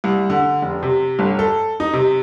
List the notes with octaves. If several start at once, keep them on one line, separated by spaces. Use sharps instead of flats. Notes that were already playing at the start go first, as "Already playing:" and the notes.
C2
D3
F1
C3
G1
A4
D#4
C3